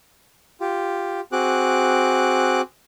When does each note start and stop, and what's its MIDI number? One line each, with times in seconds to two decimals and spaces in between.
0.61 1.21 65
0.61 1.21 67
1.32 2.61 60
1.32 2.61 66
1.32 2.61 68
1.32 2.61 86
1.32 2.61 90